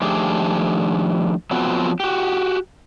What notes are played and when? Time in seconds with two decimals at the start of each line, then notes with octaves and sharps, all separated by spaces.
0.02 D#3 F3 A3 D4 G4 G#4
1.51 F3 F#3 B3 C4 F#4
2.00 F#4 G4